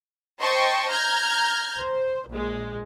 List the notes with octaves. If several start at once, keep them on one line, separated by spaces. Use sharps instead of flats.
C5 D#5 G5 A5 C6 C#6
A#5 F6 G6 G#6
C5
A#1 G#3